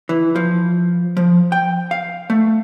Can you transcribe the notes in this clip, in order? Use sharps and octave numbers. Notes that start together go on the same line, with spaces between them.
E3
F3
F3
G5
F5
A3